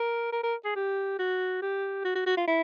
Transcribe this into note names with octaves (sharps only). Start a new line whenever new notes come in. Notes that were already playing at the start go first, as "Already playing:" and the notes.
Already playing: A#4
A#4
A#4
G#4
G4
F#4
G4
F#4
F#4
F#4
F4
E4